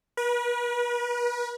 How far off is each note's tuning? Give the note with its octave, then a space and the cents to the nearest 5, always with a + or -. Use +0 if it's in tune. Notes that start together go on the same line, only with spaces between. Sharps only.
B4 -40